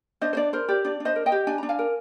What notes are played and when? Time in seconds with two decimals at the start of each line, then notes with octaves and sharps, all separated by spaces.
0.21 D4 C5 D#5
0.33 C5
0.37 D4 D5
0.53 A#4 C5
0.69 G4 D5
0.84 D4 D5
1.00 D4
1.05 C5 D#5
1.16 A#4
1.26 D#5 G5
1.32 G4
1.47 D4 G#5
1.58 D4 A#5
1.69 F5 G#5
1.79 A#4